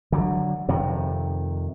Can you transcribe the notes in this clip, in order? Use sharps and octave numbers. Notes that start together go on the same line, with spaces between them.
D3 F#3
F2 C3 D#3